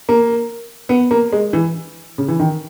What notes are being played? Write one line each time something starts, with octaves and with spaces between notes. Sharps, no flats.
A#3
B3
A#3
G#3
E3
C#3
E3
D#3